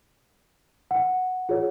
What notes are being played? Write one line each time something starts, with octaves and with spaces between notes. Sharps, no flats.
F#5
F4 G#4 C#5